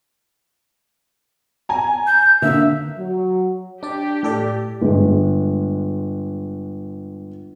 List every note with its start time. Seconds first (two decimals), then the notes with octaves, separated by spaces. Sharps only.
1.69 G#5 A#5
2.07 G6
2.42 D3 A#3 E5
2.98 F#3
3.83 D4 G4 D5
4.23 A2 A4 D5
4.82 G1 G#3